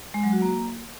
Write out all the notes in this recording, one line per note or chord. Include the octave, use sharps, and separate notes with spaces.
G#3
F#3
F#4
A#3